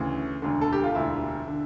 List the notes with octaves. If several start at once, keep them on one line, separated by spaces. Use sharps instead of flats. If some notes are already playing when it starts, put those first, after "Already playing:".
Already playing: D2 C#3 E3
E1 D2 D3
A4
G4
F4
E1 D2 D3 E4
D3